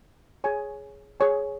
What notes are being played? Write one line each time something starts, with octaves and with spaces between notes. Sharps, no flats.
G#4 C#5 G#5
G#4 C#5 G#5